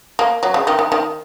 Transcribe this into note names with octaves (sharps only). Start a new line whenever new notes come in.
A#3
F#3
C#3
D#3
D#3
D#3